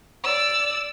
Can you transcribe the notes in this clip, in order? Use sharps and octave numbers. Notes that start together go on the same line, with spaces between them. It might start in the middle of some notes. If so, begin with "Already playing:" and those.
D5 E6